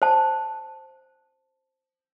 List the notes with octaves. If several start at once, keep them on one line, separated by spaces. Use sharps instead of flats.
C5 A5